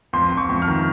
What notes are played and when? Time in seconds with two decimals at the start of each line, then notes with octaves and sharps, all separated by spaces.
0.13 F2 C6
0.32 F2
0.37 C#6
0.49 F2
0.62 F6
0.68 D#3